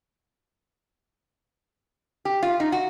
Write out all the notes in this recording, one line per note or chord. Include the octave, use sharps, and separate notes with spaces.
G4
F4
D#4
F#4